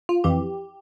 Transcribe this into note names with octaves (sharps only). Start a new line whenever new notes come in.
F4
F2 E3 G4